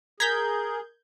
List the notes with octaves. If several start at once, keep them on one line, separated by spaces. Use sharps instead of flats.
G#4 A#4 A#5 G6 G#6 B6